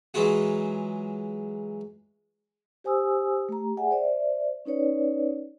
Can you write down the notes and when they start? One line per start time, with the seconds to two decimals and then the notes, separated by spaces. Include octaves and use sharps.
0.14 E3 F#3 G#3 F4 F#4
2.84 G4 C5 G#5 D#6 E6
3.49 A3 G4 A#5
3.77 G#4 D5 E5 F#5 G#5
3.91 C5 D5 E5
4.65 C#4 D#4 B4 C#5 D5